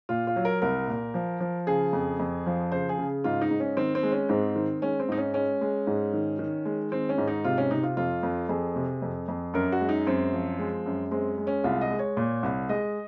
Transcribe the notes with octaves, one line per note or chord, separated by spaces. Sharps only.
A#2 F4
F4
F#3
A#4
C2 A#4
A#2
F3
F3
C#3 G#4
F2
F2
F3
C#3 C5
G#4
C#3
G#2 F4
D#4
G#2
C#4
D#3 C4
C4
G#3
C#4
G#2 C4
D#3
G#3 C#4
C4
G#2 D#4
C#4
G#3 C#4
G#3
G#2
D#3
D#3
G#3
D#3 C4
C#4
G#2
D#4
C3 F4
C#4
C3 D#4
F4
F2 F4
F2
F2 G#4
C3
F2
F2
F#2 A#4
F#4
G#3
D#4
F#2 C4
F3
G#3
F#2
G#3 C4
G#3
C#4
C2 F4
D#5
G#3
C#5
A#2
C2
G#3 D#5